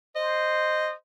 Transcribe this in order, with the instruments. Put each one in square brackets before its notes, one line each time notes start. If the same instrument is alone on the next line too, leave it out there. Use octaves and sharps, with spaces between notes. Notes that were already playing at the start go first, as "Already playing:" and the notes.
[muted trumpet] C5 [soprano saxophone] D#5